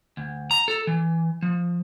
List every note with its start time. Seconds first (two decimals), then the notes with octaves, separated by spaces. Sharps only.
0.17 D2
0.51 A#5
0.68 A4
0.87 E3
1.42 F3